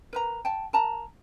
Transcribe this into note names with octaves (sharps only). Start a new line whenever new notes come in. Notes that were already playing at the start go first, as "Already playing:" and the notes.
A#4 B4 A#5
G5 A5
A#4 A5 A#5